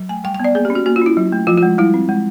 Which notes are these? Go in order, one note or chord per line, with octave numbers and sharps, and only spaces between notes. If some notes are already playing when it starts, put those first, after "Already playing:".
Already playing: F#3
A3 G#5
G3 G5
G5
B3 D5
A#3 G#4
G4
C#4
F#4
A#3 F#4
F4
C#4 E4
F#3
A3
F3 F4
F4
G#3
G3 E4
C4
G#3